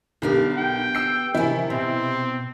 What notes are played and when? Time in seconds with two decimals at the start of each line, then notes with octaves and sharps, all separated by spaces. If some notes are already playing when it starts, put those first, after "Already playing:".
0.22 B1 D3 B3 G4 A#4 F5
0.57 G5
0.95 E6 C7
1.35 C3 D#3 E3 E4
1.70 B2 C4